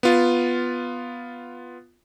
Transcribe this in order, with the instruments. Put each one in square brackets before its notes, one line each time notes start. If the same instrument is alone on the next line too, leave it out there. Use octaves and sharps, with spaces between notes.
[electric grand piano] B3 F4